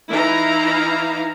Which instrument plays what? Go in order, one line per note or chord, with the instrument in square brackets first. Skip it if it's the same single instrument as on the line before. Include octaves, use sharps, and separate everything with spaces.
[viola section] E3 D#4 E4 F5 A#5